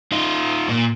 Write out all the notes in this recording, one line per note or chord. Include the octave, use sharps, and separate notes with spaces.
D#4 F4
A#2